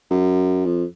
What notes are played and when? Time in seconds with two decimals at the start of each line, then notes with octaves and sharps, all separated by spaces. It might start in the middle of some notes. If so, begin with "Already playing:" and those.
0.10 F#2
0.65 F2